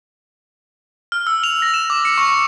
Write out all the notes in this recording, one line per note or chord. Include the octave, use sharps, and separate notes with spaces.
F6
E6
F7
A#6
E7
D6
C#7
C#6